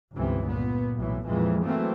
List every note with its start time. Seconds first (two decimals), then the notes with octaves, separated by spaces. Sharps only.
0.15 G1 C#2 C3 E3
0.46 A#2 B3
0.95 B1 A2 E3
1.27 F2 A#2 E3 F3 G#3
1.65 E3 F#3 A3 A#3 C4